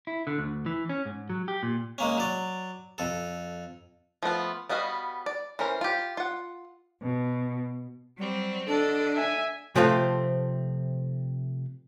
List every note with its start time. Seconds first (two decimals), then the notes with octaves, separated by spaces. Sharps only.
0.07 E4
0.27 D3
0.38 D2
0.66 E3
0.89 C#4
1.06 G#2
1.30 F#3
1.48 G4
1.63 A#2
1.98 G#3 A#3 C#4
2.17 F#3 D5
2.98 F2 A4
4.23 F3 A3 B3 F4
4.69 G3 B3 F#4 D#5 F5
5.26 D5
5.59 E3 C#4 A#4 C5
5.81 F4 G4
6.17 F4 F#5
7.02 B2
8.18 F#3 G3 C4
8.68 D3 D4 A4 D5 D#5
9.15 E5 G#5
9.75 C3 F3 A3 C4 A4 F5